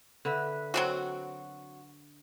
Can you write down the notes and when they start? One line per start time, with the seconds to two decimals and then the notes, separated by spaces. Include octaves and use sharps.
0.25 D3 B4 E5
0.74 F#3 C4 F#4